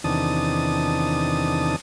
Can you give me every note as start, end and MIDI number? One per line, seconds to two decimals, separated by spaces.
0.04 1.76 40
0.04 1.76 48
0.04 1.76 51
0.04 1.76 62
0.04 1.76 81
0.04 1.76 87